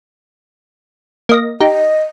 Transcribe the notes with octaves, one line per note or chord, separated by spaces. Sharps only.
A#3 D#5 A#6
D#4 G4 D#5